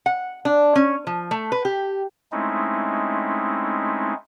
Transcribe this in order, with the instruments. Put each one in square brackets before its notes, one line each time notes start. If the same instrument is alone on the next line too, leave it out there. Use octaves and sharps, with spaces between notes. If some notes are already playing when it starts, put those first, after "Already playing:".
[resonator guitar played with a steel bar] F#5
D4
C#4
F3
A3
B4
G4
[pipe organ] G#3 A3 C4 C#4 D#4 E4